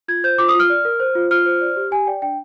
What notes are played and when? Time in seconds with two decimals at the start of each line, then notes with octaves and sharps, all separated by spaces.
0.08 F4 G#6
0.24 C5 G6
0.38 F4 D6
0.48 D#6
0.54 F4
0.60 F6
0.70 D5
0.85 A#4
1.00 C5
1.15 F4
1.31 F4 F6
1.46 C5
1.61 D5
1.76 G4
1.91 G4 G#5
2.07 D5 G5
2.22 D4 G5